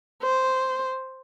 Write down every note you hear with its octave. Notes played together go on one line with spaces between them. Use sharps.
C5